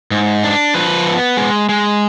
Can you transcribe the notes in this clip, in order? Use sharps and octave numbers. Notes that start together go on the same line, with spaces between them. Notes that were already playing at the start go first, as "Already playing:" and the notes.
G#2
D4
F3 B4
B3
G#3
G#3